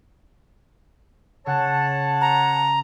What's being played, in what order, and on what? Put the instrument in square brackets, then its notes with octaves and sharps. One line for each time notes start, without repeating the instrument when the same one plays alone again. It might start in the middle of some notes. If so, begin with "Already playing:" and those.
[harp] C#3 [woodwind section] C#5 F#5 A5
[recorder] A#5